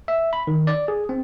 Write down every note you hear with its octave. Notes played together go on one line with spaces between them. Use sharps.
E5
B5
D#3
D5
G#4
C4